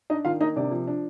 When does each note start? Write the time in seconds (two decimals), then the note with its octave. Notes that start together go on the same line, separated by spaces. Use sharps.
0.10 D4 D#4 D#5
0.25 D#3 F4 F5
0.41 A#3 D#4 D#5
0.56 C3 D4 D5
0.72 F3
0.88 D4